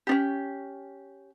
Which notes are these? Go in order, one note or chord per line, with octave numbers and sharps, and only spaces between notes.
C#4 D4 G4